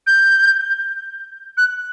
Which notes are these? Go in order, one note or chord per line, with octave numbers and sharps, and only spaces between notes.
G6
F#6